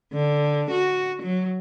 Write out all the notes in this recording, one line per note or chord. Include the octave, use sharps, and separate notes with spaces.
D3
F#4
F#3